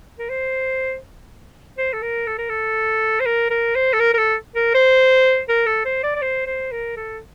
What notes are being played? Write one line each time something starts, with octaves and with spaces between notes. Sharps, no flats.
A#4
C5
C5
A4
A#4
A4
A#4
A4
C5
A#4
A#4
C5
A4
A#4
A#4
A4
A#4
C5
A#4
A4
C5
D5
D5
C5
C5
A#4
A4